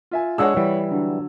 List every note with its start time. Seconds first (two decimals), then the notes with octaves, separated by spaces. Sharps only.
0.11 F4 E5 G#5
0.38 G#3 D4 G#4 C#5 F#5 E6
0.57 E3 G3
0.91 D3 F#3